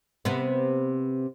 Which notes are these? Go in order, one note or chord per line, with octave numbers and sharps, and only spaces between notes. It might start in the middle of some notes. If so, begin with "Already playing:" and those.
C3 B3